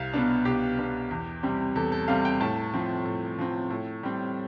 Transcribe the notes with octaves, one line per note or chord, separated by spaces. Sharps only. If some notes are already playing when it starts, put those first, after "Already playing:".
Already playing: C2 F5
B2 B3 D4
C2 G4
B2 B3 D4
E2
C3 G3 C4
E2 A4
A4
C3 G3 C4 F5
G5
A2 A5
F3 C4
A2
F3 C4
A2
G3 C4